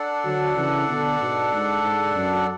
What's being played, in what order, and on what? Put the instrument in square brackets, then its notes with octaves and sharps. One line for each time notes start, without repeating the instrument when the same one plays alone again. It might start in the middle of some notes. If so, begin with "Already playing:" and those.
Already playing: [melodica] D4 A4 D5 F#5
[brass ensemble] D3 F#3
C#3 E3
B2 D3
G#2 B2
G#2
G#2
F#2